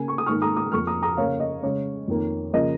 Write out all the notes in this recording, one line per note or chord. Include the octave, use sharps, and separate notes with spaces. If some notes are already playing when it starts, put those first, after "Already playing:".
Already playing: C#3 A#3 G#5
C#6
D#6
G#2 D#3 A#3 C#6 F6
A#5 D#6
A#5 D#6
F2 F3 A#3 C#6 F6
A#5 D#6
A#5 D#6
C#3 A#3 C#5 F5
D#5
C#3 G#3 C#5
F2 D#3 A#3
C#3 F3 A#3 D#5